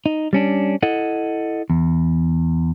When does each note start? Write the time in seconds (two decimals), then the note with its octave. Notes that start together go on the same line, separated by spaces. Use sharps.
0.06 D#4
0.33 G3 C#4 D4
0.83 E4 A4 D#5 F#5
1.70 E2